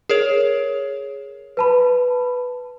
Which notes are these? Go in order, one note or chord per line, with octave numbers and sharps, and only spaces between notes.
G#4 A#4 C#5
B4 A5 B5